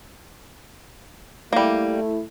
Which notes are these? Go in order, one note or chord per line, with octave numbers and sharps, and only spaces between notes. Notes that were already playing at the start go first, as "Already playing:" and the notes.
G3 A3 A#3 E4